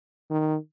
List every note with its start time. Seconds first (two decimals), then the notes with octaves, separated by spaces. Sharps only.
0.31 D#3